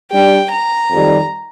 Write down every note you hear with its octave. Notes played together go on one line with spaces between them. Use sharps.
G3 D4 G4 G5
A#5
F2 D#3 G3